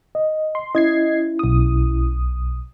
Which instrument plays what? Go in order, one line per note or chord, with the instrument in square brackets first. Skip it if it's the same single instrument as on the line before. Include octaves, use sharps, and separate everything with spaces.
[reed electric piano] D#5
[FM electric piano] C6
[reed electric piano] C#4 E4 [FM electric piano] D#5 G#6 C7
[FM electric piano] B1 D#6